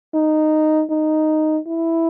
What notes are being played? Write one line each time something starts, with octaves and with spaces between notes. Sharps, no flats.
D#4
D#4
E4